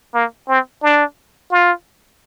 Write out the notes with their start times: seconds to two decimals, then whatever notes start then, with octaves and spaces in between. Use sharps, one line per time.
0.14 A#3
0.49 C4
0.83 D4
1.51 F4